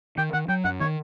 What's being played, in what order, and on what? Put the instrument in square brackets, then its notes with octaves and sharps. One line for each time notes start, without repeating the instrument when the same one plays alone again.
[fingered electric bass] D#3 [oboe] G5
[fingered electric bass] D#3 [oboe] F#5
[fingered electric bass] F#3 [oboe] G5
[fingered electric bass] F#2 [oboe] F#5
[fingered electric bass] D#3 [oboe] C#5